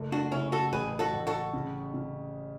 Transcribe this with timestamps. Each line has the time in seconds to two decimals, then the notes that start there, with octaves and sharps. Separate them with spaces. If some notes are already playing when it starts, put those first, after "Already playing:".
Already playing: F#1 A3
0.12 D4 F#4
0.32 C#3 C#4 E4
0.52 F#4 A4
0.72 A1 G#4 B4
0.99 F#4 A4
1.13 A1
1.27 F#4 A4
1.53 C#3
1.94 C#3